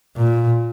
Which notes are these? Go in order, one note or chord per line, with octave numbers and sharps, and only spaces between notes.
A#2